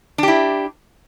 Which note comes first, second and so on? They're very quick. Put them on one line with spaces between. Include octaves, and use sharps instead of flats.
D4 G4 E4